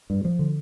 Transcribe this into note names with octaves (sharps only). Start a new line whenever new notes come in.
G2
F3
D3